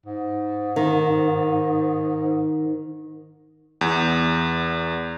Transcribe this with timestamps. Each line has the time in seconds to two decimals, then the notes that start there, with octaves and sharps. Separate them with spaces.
0.06 G#2
0.76 D#3
3.81 E2